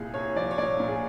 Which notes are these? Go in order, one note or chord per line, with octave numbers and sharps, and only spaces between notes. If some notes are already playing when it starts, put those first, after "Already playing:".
Already playing: C2 A#2 G#4
C2 C#5
F3 D5
C#5
A#2 D5
A#2
G#4